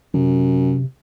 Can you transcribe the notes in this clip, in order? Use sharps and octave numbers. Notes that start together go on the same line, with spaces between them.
F#2 C3